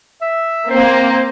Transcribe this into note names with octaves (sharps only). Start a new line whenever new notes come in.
E5
A#3 C4 C5